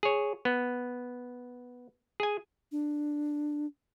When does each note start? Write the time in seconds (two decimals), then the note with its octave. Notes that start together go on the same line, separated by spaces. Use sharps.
0.03 G#4 C#5
0.45 B3
2.20 G#4 G#5
2.72 D4